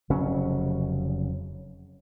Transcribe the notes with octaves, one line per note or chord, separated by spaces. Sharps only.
F1 C#3 F#3 C#4